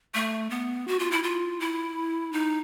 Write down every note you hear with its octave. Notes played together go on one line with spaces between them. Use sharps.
A3
B3
F#4
F4
E4
F4
E4
D#4